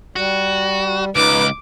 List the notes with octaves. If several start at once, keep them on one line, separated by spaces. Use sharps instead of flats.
G3 F#4
C#2 D#4 B4 D6